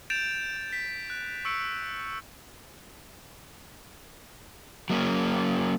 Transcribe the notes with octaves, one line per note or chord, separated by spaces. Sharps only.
G6 A6 D7 E7 F7
B6
F#6
C#6 E6 C#7 D7
F#3 A#3 C4 C#4